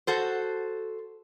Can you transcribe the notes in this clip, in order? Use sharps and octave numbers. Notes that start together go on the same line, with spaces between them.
F#4 A4 C5